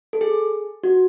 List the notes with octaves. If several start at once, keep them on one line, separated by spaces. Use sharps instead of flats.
A4
G#4
F#4